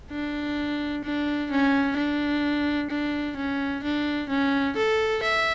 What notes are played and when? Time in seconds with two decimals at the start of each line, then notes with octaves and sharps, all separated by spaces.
0.11 D4
1.04 D4
1.51 C#4
1.97 D4
2.90 D4
3.37 C#4
3.84 D4
4.29 C#4
4.77 A4
5.23 E5